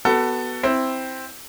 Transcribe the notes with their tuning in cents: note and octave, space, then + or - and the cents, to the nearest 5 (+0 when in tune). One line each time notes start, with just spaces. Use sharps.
B3 +0 F#4 +25 A4 +15
C4 +0 E4 -5